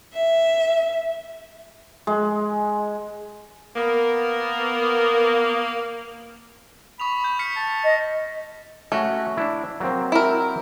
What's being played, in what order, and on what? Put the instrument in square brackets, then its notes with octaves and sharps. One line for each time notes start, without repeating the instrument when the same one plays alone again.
[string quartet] E5
[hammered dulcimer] G#3
[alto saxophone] A#3 [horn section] B3 A#4
[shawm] B5 [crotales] C#6 D#6 F7
[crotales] G6
F6 B6 C#7
[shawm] A5
[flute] D#5
[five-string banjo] A3 [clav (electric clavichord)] C#4 F#4
[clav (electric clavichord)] D4 E4
F#3 A#3 C4
[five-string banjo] E4 A#4